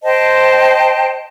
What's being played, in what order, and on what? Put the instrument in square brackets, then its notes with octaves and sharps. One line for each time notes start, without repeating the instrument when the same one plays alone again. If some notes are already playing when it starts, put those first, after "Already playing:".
[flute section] C5 D#5 G5 A5